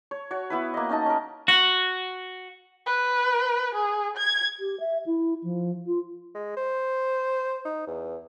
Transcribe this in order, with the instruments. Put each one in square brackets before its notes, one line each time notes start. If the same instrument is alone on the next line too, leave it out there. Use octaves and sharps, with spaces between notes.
[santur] C#5
F#4 C#5
B3 E4 B4
A#3 D#5
C#4 D#4 D#5 A5
C#4 A#4
[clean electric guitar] F#4
[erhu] B4
G#4
G#6
[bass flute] G4
E5
E4
F3
F4
[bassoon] G#3
C5
D#4
E2